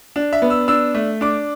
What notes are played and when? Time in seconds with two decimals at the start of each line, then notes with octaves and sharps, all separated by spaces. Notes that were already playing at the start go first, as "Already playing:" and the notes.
0.16 D4
0.33 E5
0.42 B3
0.50 E6
0.68 D4 E6
0.94 A3
1.21 D4 D6